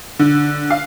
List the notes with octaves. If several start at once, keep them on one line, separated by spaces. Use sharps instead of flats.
D3
F5